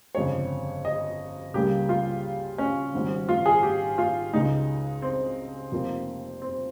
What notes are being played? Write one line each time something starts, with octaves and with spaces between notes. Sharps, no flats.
G1 F2 C#3 G#3 C4 C#5
D#5
C#2 C#3 G3 A#3 G4
F4
C#4
G#1 G#2 G3 C4
F4
G#4
G4
F4
C#2 C#3 G#3 D#4
C4
F1 F2 C3 F3 A#3
C4